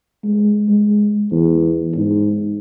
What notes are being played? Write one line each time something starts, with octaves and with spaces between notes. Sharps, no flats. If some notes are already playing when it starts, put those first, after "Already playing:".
G#3
G#3
E2
G#2